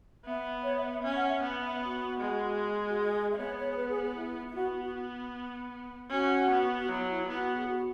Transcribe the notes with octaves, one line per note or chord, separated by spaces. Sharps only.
B3 E5
C#5
E5
E5
C#4 E5
F#5
E5
B3
E5
F#4
G#3
F#4
G#4
E5
B3 C#5
C#5
G#4
B4
G#4
G#4
E4
E4
B3 F#4
F#4
C#4 F#4
B3
F#4
F#3 E4
F#4
E4
B3 F#4
G#4
F#4